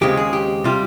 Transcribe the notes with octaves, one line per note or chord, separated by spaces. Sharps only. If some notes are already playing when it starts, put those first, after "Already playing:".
D#2 C#3 G#3 C4 G4
G#4
G4
C3 G3 F4